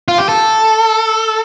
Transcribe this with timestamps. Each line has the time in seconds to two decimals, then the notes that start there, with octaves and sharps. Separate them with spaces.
0.08 F4
0.18 G4
0.29 A4